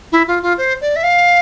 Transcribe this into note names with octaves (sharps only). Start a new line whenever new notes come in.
E4
F4
F4
C5
D5
E5
F5